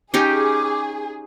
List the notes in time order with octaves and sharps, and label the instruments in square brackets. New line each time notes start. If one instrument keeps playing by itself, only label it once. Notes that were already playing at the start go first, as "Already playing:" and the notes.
[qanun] C#4 D#4 G4 [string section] G#4 [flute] D6